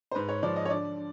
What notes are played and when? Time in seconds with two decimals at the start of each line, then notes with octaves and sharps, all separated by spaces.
0.11 C5
0.15 G#2 B4
0.29 C#5
0.43 F3 D5
0.56 D#5
0.65 C#5
0.70 D3 D5
0.97 D3